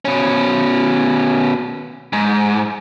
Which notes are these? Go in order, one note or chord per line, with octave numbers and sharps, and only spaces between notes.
B2 C#4
G#2